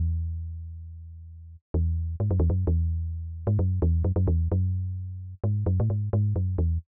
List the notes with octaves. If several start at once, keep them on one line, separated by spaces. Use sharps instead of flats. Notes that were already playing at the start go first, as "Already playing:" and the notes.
Already playing: E2
E2
G#2
F#2
E2
F#2
E2
G#2
F#2
E2
F#2
F#2
E2
F#2
G#2
F#2
A2
G#2
G#2
F#2
E2